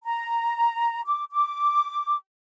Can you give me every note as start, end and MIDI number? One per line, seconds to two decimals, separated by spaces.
0.04 1.01 82
1.06 1.23 86
1.31 2.15 86